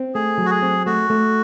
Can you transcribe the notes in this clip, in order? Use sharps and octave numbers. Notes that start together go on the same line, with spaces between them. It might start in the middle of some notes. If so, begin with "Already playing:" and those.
Already playing: C4
A3 G#4
F#3
F#4
G#4
C4
A3 F#4
A3